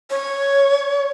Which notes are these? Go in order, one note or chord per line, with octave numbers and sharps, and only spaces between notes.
C#5